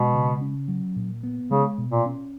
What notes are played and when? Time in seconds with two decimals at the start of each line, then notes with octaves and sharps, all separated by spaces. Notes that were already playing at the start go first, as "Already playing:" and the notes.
Already playing: B2 G#3
0.14 C#3
0.41 C#4
0.68 F#3
0.96 A#2
1.23 B3
1.51 C#3 G#3
1.78 B2
1.91 A#2
2.06 C#4